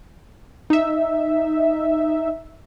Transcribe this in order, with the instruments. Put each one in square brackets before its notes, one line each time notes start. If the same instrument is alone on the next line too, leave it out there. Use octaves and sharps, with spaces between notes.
[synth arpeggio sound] D#4 E5